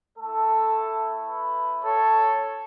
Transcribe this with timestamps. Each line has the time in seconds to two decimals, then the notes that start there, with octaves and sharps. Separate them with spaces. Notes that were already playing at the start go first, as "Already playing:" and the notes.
0.18 A3 E4 A4
1.28 B4
1.83 A4 C#5